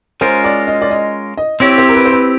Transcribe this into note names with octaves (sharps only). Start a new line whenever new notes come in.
G#3 C#4 F4 A#4 C5
D5
D#5
D5
D#5
D#5
C4 E4 G4 C#5
C5
A#4
B4
C5
B4